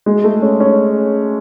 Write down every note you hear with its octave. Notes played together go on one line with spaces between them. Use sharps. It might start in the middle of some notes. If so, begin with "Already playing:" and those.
G#3
A3
C#4
C#4